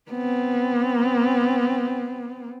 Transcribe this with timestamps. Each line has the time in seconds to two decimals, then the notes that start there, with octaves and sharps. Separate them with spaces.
0.11 B3 C4